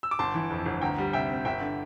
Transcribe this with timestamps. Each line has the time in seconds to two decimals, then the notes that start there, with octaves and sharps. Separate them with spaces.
0.03 E6
0.11 D6
0.19 G1 A5 C6
0.35 E3
0.50 F2
0.66 G1
0.81 D2 G5 A#5
0.98 G3
1.13 C3 E5 G5
1.30 C4
1.45 G1 E5 G5
1.61 D3